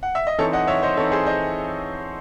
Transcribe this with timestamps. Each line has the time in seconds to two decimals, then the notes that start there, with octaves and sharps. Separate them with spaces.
0.03 F#5
0.15 E5
0.27 D#5
0.38 E3 C4 D#4 A4 C#5
0.53 D#5 F#5
0.67 C#5 E5
0.83 C5 D#5
0.97 E3 C4 D#4 A4 C#5
1.12 G#4 C5
1.26 C5 D#5